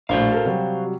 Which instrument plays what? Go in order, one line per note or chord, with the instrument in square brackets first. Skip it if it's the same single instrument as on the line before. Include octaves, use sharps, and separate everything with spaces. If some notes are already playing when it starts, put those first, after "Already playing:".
[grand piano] A#1 A2 [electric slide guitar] F#4 C5 F5
[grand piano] A4 A#4
C3 F#3 G3